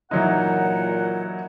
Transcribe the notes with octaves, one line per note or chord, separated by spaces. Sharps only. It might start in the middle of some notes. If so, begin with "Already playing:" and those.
A#2 E3 F#3 D#4 F#5